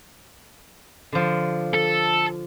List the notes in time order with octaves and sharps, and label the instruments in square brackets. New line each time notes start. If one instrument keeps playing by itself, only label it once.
[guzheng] D3 F3
[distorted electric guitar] A4